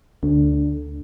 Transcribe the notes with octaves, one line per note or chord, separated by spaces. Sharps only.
D2 D3